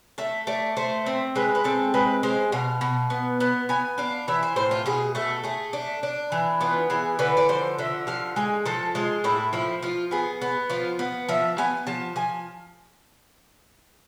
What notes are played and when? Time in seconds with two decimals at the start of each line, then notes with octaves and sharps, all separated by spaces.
0.18 A3 E5
0.47 A3 D5
0.77 A3 C5
1.06 C4
1.36 G#3 B4
1.55 B4
1.64 C4 A4
1.94 G#3 B4
2.23 G#3 C5
2.52 B2 F5
2.81 B2
3.10 B3
3.40 B3
3.69 B3 G#5
3.98 D4 F5
4.28 E3 E5
4.43 C5
4.56 A2 C5
4.71 F4
4.86 B2 G#4
5.15 A3 A4
5.44 A3 G#4
5.73 D4
6.03 D4
6.32 E3
6.61 B3 F4
6.90 E3 G#4
7.19 D3 B4
7.37 D5
7.49 F3 C5
7.78 D3 E5
8.07 F3 F5
8.36 G#3 G#5
8.66 F3 A4
8.95 G#3 F4
9.24 A2 E4
9.53 F3 E4
9.83 F3 F4
10.11 B3 G#4
10.41 B3
10.70 F3 F4
10.99 B3
11.28 F3 E5
11.58 B3 G#5
11.87 F3 A5
12.16 F3 G#5